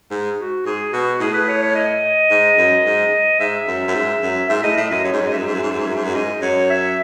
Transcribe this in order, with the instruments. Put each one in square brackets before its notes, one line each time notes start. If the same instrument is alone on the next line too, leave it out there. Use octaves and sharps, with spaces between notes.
[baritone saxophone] G#2
[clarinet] F#4
[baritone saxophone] G#2 [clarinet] G#4
[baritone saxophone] B2 [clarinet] F#4
[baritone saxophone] A2 [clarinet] G#4
[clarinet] B4
C#5
C#5
D#5
[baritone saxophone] G#2
F#2
G#2
[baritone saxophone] G#2 [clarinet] E5
[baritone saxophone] F#2
F#2
G#2
F#2
[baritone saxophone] G#2 [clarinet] E5
[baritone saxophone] A2 [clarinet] D#5
[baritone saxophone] A2 [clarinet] E5
[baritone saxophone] F#2 [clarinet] D#5
[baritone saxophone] F#2 [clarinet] C#5
[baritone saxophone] G#2
F#2
[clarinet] D#5
[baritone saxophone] G#2
[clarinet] E5
[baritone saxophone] F#2
G#2
F#2
G#2
F#2
G#2
F#2
G#2
F#2
[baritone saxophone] G#2 [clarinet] D#5
[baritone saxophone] F#2 [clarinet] C#5
[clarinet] E5